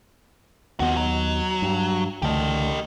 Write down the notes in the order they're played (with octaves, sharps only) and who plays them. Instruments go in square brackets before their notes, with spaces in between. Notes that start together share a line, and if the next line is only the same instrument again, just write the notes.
[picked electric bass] D#2 D#3 B3 [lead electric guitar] F3 F#4
[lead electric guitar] F#3
[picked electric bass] G2
[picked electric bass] C#2 D3 A3 [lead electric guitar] G4 D#5